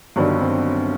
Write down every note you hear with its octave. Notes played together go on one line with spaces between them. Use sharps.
G1 G2 D#3 F#3 D4
C4